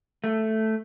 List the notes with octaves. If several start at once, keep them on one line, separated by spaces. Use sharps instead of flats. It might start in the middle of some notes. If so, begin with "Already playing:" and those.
A3